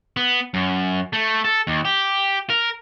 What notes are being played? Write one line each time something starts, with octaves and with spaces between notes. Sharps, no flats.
B3
F#2
A3
A4
D#2
G4
A#4